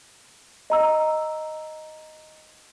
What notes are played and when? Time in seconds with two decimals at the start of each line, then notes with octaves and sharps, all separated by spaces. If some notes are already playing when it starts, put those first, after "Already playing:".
0.70 D#5 A#5 E6